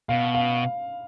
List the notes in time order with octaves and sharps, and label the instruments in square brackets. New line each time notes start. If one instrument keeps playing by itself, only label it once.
[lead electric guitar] B2 [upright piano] F5
[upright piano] F5